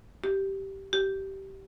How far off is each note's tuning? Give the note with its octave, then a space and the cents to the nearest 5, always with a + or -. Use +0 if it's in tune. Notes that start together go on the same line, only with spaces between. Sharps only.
G4 -10
G4 -20